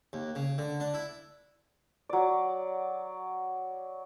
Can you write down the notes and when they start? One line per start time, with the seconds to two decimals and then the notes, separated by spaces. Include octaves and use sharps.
0.13 D#2
0.35 C#3
0.58 D3
0.80 D4
0.94 E4
2.09 F#3 D5